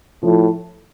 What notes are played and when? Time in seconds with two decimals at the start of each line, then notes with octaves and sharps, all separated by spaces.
0.23 A2 F3